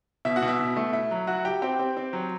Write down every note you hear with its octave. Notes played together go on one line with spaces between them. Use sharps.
B2 E4 E5
F#4 F#5
B2
E4 E5
B2
A3
E4
F#3
E4 F#4 F#5
E4 G4 G5
C4 G4 G5
C4
C4
F#3